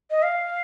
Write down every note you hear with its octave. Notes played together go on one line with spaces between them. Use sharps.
D#5
F5